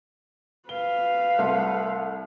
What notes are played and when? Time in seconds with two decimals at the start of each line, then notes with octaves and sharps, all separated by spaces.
0.69 B4 F5 G7
1.38 C2 A3 C6